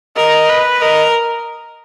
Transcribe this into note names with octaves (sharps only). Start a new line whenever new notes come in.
A#4 D#5
B4
A#4 D#5